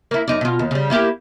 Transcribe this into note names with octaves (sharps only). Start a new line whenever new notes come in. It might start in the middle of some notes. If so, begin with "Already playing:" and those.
A#3 E4
F#2 D#4 D5
B2 F4
D#2
C#3 G3
A#3 E4 G4